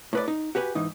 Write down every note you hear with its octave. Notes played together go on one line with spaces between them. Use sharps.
A2 B4 D5
D#4
F#4 G4 B4 G#5
G#2 E3 D#4